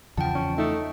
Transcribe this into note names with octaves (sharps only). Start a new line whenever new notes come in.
E2 C#3 F3 F#5 G5 A5
C#4
A3 D#4